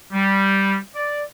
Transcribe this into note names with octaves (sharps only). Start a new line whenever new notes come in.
G3
D5